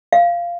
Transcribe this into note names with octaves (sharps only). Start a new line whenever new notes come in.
F5